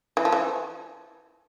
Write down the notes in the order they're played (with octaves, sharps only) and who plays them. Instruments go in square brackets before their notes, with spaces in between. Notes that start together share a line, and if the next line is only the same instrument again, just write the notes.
[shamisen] E3
F3
E3